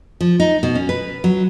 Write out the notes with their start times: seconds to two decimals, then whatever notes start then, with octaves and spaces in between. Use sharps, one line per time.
0.21 F3
0.40 D#4
0.63 B2
0.75 C#4
0.89 B4
1.24 F#3